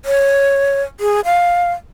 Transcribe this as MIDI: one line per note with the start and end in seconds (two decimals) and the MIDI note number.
0.05 0.82 73
1.00 1.20 68
1.25 1.72 77